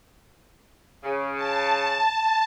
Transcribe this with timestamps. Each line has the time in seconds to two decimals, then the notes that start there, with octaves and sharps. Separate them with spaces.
1.03 C#3
1.36 A5